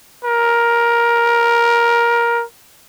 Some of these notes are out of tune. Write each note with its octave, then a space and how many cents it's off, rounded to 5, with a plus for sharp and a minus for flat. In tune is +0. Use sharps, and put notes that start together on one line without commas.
A#4 +15